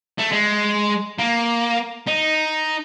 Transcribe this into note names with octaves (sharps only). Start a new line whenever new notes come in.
A3
G#3
A#3
D#4